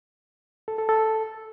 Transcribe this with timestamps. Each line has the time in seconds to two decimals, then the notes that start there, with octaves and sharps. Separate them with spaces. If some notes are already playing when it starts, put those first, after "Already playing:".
0.68 A4
0.78 A4
0.89 A4